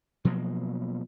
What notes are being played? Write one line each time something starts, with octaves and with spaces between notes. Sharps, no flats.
B2 F3 F#3 A#3